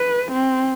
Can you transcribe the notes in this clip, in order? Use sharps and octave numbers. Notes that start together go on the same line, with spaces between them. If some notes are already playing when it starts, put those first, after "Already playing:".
Already playing: B4
C4